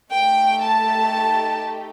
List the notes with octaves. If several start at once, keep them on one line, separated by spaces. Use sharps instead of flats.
A3 D#4 G4 G5
A5